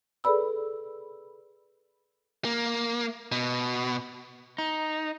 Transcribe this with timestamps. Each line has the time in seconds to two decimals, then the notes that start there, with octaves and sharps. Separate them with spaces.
0.24 G#4 A4 B4 D5 B5 E6
2.45 A#3
3.32 B2
4.58 D#4